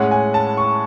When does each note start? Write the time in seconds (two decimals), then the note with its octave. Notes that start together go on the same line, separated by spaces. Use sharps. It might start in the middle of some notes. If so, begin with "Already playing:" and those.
Already playing: A2 G#3 C#4 F#5
0.11 G#5
0.34 A5
0.57 C#6